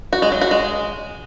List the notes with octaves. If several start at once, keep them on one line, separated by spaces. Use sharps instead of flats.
F#4
G#3
F#3
F#4
G#3